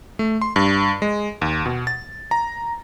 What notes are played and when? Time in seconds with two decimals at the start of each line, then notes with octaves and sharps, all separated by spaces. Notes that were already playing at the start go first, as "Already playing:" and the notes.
0.19 A3
0.42 C6
0.56 G2
1.02 G#3
1.42 D#2
1.66 B2
1.87 A6
2.31 A#5